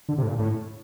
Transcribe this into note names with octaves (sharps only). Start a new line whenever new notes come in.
D3
C3
A2
A#2
A2